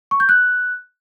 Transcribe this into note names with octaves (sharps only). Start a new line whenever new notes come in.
C#6
G6
F#6